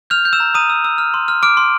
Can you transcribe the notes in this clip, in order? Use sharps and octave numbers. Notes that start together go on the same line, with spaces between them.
F6 G6 F7
G6
E6 E7
A#5
A#5 D#6 D#7
E6
E6
F6
C6
F6
D6 F6 D7
C6